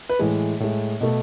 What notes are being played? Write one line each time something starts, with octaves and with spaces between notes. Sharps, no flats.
B4
A2 E3 G#3
A2 G#3
B2 A3